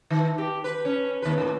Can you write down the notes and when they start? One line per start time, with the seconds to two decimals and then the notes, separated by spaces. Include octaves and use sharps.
0.10 D#3
0.38 G4
0.64 B4
0.85 C#4
1.22 D#2 B4
1.38 A2